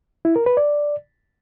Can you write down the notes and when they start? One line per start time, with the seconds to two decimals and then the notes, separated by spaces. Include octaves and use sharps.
0.25 E4
0.36 A#4
0.46 B4
0.57 D5